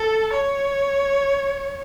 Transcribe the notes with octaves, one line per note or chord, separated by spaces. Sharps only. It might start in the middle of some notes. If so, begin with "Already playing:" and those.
Already playing: A4
C#5